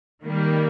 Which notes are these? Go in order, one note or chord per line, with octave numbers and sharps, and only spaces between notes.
D#3 G3 A#3